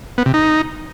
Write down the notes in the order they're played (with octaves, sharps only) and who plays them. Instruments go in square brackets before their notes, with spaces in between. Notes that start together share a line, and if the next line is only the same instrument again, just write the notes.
[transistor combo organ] B3
C3
D#4